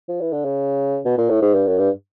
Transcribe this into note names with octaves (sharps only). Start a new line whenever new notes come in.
F3
E3
D3
C#3
B2
A#2
A2
G#2
G2
F#2
G2